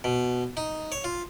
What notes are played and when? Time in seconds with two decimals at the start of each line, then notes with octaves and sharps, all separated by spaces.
0.04 B2
0.57 D#4
0.92 C#5
1.04 F4